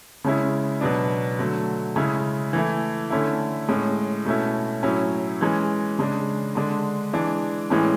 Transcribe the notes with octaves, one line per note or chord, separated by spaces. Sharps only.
C#3 G#3 C#4 E4
B2 F#3 B3 D4
D3 F#3 A3
C#3 G#3 C#4 E4
E3 A3 E4
D3 A3 C#4 E4
A2 G#3 C#4
B2 A3 C#4 E4
A2 F#3 C#4 E4
E3 G#3 C#4
C#3 G#3 D4
D3 G#3 D4
E3 G#3 D4
A2 E3 G#3 C#4